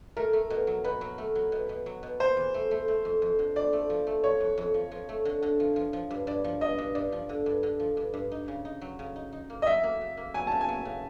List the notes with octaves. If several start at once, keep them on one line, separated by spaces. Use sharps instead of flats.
A3 A#4
A3
B2
F#3
B2 B4
F#3
A3
F#3
B2
B2
F#3
B2
B2 C5
E2
A3
A3
A3
F2
F2
D3
F2 D5
A3
F3
A3
F3 C#5
F2
F2
F3
F3
A3
D3
D3
F3
F3
F3
G2
G2 D5
F3
G2 D#5
G2
G2 D5
F3
D3
G2
D3
F3
G2
G2
D#4
C#3
D#4
F#3
C#3
D#4
D#4
A#3
D#5
F#3 E5
A#3
C#3
A#3
F#3 G#5
C#3 A5
G#5
F#3
C#3